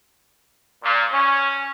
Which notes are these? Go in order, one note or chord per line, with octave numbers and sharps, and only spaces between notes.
A#2
C#4